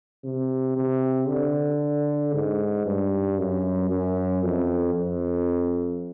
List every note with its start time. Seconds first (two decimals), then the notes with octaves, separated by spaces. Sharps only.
0.24 C3
0.76 C3
1.28 D3
2.34 G#2
2.86 G2
3.38 F#2
3.89 F#2
4.43 F2
4.94 F2